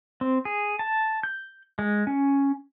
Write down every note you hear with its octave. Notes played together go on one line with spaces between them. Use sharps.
C4
G#4
A5
G6
G#3
C#4